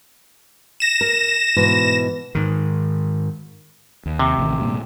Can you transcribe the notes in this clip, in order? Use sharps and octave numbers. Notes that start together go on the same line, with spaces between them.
A#6 E7
A#4
G#2 B2 E3
G#2 D#3
D#2
C3
A1 D#3
G2 A#2